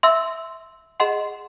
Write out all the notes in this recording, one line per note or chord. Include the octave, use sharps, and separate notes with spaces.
E5 C6 E6
G#4 D#5 F#5 C6